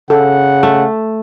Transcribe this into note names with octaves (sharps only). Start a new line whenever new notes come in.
C#3 A4 F#5
A3